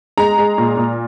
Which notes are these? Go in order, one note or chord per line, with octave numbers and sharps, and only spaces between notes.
G#3 A#5
G#3
A#2
A#2